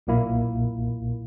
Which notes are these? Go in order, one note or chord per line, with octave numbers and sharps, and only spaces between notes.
B1 A#2 A#3 E4